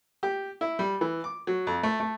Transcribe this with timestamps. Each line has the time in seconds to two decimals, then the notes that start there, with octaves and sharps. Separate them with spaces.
0.23 G4
0.61 E4
0.79 G3
1.01 E3
1.24 D6
1.47 F#3
1.67 F2
1.83 A3
2.00 A3